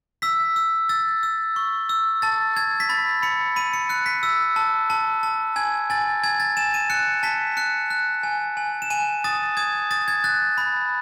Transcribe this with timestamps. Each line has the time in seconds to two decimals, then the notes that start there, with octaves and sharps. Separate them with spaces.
0.22 E6 B6
0.56 E6
0.89 E6 A6
1.23 E6
1.56 C#6
1.89 E6
2.22 A5 A6
2.56 A5 G#6
2.80 B6
2.89 B5 A6
3.23 B5 C#7
3.56 B5 D#7
3.74 C#7
3.89 F#6 C#7
4.06 B6
4.23 E6
4.56 A5
4.90 A5
5.23 A5
5.56 G#5 G#6
5.90 G#5 A6
6.24 G#5 G#6
6.40 A6
6.57 G#5 E7
6.74 D#7
6.90 F#6 C#7
7.23 A5 B6
7.57 F#6 C#7
7.90 F#6
8.23 G#5
8.57 G#5
8.82 E7
8.90 G#5 D#7
9.24 D#6 A6
9.57 D#6 G#6
9.91 D#6 A6
10.08 G#6
10.24 F#6 A6
10.58 B5